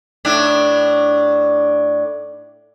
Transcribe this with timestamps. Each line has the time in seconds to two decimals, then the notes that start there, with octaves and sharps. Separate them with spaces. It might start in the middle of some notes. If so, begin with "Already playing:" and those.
0.25 A2 D4